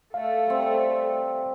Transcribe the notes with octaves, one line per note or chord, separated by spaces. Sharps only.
A3 A4 F5
G3 C4